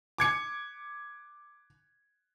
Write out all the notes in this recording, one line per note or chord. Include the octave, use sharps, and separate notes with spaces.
D6 G#6 C#7